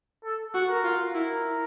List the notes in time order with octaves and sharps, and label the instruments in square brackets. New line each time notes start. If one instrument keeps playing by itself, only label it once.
[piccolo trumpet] A4
[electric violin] F#4
[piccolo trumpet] A#4
[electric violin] F4
[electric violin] E4 [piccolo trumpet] A#4